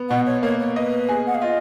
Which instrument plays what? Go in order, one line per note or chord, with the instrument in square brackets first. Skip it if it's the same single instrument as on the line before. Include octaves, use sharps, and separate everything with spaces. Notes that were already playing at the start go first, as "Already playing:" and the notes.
Already playing: [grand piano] B3
[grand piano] B2 [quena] F#5
[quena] C#5
[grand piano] A#3 [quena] C#5
[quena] C#5
[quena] B4 [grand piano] D#5
[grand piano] G#4
[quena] F#5
F5
[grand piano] F4 [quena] D#5